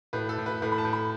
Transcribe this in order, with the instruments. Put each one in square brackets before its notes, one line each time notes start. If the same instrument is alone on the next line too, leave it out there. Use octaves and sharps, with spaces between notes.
[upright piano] A2 B4
A4
A2
B4
A2 B4
B5
A5
A2
B5